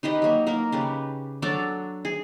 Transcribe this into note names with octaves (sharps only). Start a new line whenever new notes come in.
D#4 G4 B4 D#5
F#3 A#3
A#3 A#4
C#3 G4 B4
F#3 D4 A4 D6
G#4